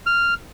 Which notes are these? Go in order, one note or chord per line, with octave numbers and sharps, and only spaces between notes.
F6